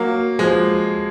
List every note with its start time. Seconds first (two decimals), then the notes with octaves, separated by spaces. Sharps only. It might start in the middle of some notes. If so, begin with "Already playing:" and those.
Already playing: F#3 A#3
0.39 F3 G#3